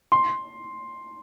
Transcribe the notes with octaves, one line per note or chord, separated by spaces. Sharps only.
C6